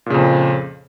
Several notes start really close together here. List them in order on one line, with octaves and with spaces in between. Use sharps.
A#2 C#3 F2